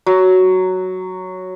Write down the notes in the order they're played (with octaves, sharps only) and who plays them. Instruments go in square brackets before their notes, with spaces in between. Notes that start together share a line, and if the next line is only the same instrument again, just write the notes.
[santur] F#3